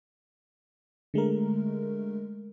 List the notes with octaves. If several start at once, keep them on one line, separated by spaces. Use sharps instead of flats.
D3 G#3 A3 A#4